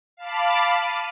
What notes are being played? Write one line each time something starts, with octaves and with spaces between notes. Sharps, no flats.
F5 A5 B5 D6
D#7